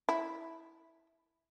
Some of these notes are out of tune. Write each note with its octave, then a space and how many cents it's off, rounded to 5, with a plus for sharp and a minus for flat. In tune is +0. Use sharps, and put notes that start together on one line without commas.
E4 -10